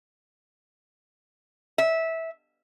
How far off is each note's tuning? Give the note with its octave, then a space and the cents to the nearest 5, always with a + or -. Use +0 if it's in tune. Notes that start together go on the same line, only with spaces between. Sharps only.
E5 -15